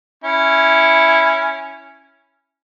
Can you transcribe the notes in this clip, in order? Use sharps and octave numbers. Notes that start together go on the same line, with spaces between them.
C#4 E4